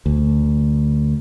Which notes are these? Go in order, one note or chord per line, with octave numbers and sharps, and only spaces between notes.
D2